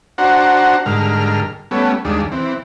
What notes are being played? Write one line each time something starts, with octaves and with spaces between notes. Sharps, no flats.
D4 F#4 C5 F#5 A#5
G#2 D3 G3 A#4 F6
G3 A3 B3 C#4
D#2 G3 G#3 D4
E3 C4